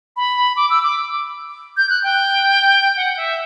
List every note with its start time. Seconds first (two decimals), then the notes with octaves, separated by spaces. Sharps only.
0.17 B5
0.56 D6
0.70 E6
0.83 D6
1.77 G6
1.90 F#6
2.04 G5
2.97 F#5
3.17 E5